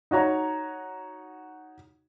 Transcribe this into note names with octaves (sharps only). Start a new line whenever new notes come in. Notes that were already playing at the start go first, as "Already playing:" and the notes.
D#4 F#4 C#5 A#5